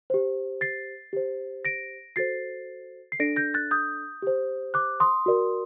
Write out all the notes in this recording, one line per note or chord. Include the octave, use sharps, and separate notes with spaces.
G4 C5
A6 C7
G4 C5
A#6 D7
F#4 A4 C5 A6 C7
C7
D4 A4 D5 A#6 D7
G6 A#6
F#6 A6
D#6 G6
G4 C5
D6 F#6
C6 D#6
F#4 A#4 D5